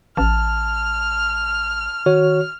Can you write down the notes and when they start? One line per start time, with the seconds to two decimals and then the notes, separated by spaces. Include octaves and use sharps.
0.17 A1 A5 F6
2.06 D#3 F#4 C#5